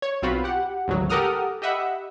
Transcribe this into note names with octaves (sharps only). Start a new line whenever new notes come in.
C#5
B1 C4 F4 F#4 B5
G4 F#5
G#1 D2 C#3 F#3
G4 A4 A#4 F#5 D#6 F6
G4 D#5 E5 F#5 B5